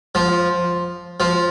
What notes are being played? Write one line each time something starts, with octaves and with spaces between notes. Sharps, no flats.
F3
F3